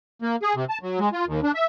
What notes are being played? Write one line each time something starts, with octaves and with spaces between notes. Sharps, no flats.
A#3
G#4
C3
A5
F#3
G#3
F4
D#2
D4
E5